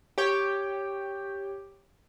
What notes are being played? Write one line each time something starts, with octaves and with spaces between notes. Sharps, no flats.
G4 C#5 G5